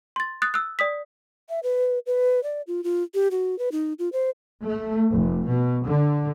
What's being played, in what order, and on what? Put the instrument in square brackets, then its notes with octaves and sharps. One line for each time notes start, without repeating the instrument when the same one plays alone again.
[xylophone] C6 A6
D#6 F#6 A6
E6 F#6
D5 D#6 B6
[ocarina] E5
B4
B4
D5
F4
F4
G4
F#4
B4
D#4
F4
C5
[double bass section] A3
F1
B2
D3